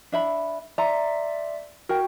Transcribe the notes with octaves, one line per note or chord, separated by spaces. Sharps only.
D4 E5 B5
D5 E5 A#5 C6
F#4 A#4 G5